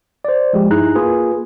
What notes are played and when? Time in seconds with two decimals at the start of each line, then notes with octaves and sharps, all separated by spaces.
0.25 C5 D5
0.53 F3 G#3 G4
0.70 G2 D#4 E4 G#4 A#5 F#6
0.95 A#3 F4 G#4 B4